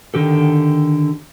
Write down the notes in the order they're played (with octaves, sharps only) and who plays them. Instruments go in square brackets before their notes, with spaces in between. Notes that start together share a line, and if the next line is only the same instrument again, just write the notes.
[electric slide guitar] D3 D#3 G4 A4